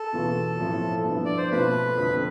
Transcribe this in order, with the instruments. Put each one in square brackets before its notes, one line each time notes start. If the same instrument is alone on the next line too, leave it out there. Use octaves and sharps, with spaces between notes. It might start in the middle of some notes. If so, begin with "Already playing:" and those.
Already playing: [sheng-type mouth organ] A4
[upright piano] E2 B2 B3 F4
A2 F3 A3 C4 E4
G2 F3 B3 E4
[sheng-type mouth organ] D5
C5
[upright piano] B2 A3 C4 F4 [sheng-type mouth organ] B4
[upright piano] F2 D3 F3 C4